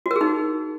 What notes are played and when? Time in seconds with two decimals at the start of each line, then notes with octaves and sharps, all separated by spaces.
0.06 F#4
0.11 A#4
0.16 G#4
0.21 D#4